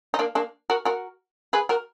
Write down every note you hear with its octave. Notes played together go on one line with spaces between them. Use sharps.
D#4
A#3 D4
A#3 D4
F#4 A#4
F#4 A#4
G#4 B4
F#4 A#4